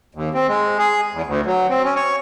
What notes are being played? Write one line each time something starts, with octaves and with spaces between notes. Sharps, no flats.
D#2
C4
G#3
G#4
E2
D2
F#3
C4
C#4
C#5